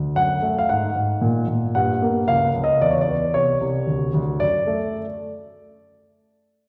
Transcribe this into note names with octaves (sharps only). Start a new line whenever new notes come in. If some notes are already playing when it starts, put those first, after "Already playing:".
Already playing: D2
F#2 F#5
A3
F5
G#2 F#5
G#2
A#2
A#2
G2 F#5
A#3
C#2 F5
C#2
D#5
E2 D5
C#5
D5
B3
C2 C#5
C2
D2
D2
F#2 D5
A3